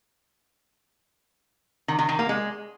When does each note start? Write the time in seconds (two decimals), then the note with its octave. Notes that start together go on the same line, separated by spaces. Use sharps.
1.88 D#3
1.99 D#3
2.09 D#3
2.19 A#3
2.29 G#3